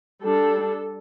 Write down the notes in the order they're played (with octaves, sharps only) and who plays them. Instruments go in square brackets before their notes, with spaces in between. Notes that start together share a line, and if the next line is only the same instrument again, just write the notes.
[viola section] G3 D4 A4